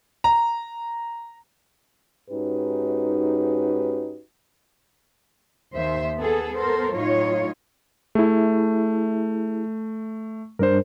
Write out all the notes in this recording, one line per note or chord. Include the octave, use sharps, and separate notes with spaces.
A#5
G#2 C#4 D#4 F#4 G4 B4
D#2 C5 E5
B3 G#4 A4
B3 A4 A#4 C5
A2 F#3 D#4 F4 C#5
A3 E4 G#4
G2 G3 D4 A#4 C5